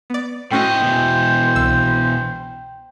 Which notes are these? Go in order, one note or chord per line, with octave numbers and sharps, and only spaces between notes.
B3 D5
A2 A3 C#4 F#4 C5 D#5 G5
B2 E3
C2 E6